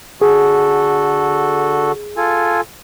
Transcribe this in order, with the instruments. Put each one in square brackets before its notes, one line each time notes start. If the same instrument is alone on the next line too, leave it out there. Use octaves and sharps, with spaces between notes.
[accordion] D3 F#4 A4 [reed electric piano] G#4
[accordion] F4 A4 G#5